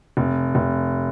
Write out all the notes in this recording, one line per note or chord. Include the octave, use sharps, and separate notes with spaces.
F1
F1